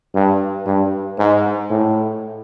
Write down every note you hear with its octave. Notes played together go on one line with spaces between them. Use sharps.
G2
G2
G#2
A2